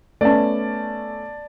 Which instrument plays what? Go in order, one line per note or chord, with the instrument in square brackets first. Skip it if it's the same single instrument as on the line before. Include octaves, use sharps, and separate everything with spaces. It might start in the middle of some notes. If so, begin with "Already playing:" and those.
[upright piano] A3 B3 C#4 [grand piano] D5 A5